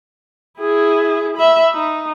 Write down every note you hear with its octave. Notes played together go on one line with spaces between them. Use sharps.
E4 G#4
E5 B5
D#4